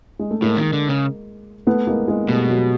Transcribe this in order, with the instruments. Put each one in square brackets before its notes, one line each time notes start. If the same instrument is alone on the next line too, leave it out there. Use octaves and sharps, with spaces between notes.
[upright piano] G#3
A3
[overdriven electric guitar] A2 [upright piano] G#3 A#3
[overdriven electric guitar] D#3
D3
C#3
[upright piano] A3 B3
G#3 A#3
G#3 A#3
[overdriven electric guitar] B2 [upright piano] G3 A3
[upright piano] F#3 G#3